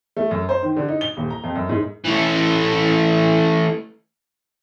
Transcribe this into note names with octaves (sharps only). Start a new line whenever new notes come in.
A3
F#2
C5
D#3
D3
D#4
G7
D#1
A#5
F2
F#2
G#2
E3 A3